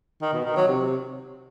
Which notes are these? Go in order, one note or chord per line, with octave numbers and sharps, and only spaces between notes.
D#3
B2
D#3
F#3
C3